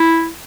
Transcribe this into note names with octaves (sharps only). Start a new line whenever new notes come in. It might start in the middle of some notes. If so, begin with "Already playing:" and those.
Already playing: E4